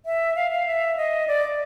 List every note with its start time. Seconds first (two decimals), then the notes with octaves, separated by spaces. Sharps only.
0.06 E5
0.35 F5
0.51 F5
0.66 E5
0.97 D#5
1.27 D5